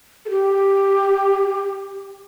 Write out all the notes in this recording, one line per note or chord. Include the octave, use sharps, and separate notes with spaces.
A4
G4